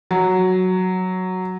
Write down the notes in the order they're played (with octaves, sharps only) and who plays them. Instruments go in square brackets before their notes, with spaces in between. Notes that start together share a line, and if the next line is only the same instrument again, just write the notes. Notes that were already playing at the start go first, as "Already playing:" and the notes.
[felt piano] F#3